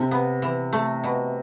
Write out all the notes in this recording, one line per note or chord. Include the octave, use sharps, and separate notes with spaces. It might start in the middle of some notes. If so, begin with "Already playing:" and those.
Already playing: C3 A4
B3
E3
A3
B2